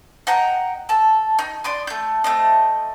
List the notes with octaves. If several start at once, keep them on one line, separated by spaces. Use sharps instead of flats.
D#5 F#5 G5 A#5
A4 A5
D#4
D5 C6 D#6
A3 G6
A3 C4 D#5